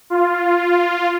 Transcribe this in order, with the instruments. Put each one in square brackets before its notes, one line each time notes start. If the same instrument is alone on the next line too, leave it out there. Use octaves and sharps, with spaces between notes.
[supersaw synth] F4